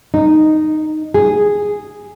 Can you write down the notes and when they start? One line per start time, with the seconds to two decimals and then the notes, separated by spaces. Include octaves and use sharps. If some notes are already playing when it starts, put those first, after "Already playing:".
0.14 D#4
1.14 G#4